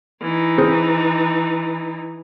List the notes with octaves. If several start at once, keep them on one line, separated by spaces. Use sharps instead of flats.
E3 D#4
C4 G#4 C5